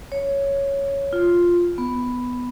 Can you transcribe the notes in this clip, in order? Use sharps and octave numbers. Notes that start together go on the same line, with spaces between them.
C#5
F4
B3